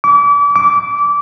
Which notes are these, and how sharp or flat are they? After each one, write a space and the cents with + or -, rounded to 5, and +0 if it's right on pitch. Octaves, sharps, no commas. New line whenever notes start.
D6 -35
D6 -20